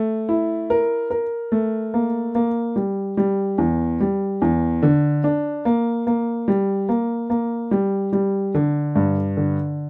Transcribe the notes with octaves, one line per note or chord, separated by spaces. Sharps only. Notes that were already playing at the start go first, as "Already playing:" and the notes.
Already playing: A3
E4
A#4
A#4
A3
A#3
A#3
G3
G3
E2
G3
E2
D3
D4
A#3
A#3
G3
A#3
A#3
G3
G3
D3
G2
D3